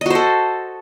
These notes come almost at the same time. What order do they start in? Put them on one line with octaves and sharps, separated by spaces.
D#5 F#4 C5 A4